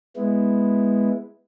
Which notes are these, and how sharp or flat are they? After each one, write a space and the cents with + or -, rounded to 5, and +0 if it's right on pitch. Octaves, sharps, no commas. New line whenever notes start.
G#3 +0 B3 +0 E4 +0